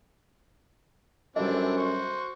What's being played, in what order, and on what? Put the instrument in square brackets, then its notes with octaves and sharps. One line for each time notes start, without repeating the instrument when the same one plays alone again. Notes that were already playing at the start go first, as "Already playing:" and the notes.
[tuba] F#2 [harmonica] E3 C4 D4 [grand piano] G3 A4 [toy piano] D#5
[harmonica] F#4 C5 C#6